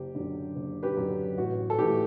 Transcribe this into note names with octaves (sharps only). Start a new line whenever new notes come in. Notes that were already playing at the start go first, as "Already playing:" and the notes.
Already playing: F#1 G4
F#2 D3
F#1
G4 B4
F#2 D3
A1 F#4
A4
A2 E3 A3 G4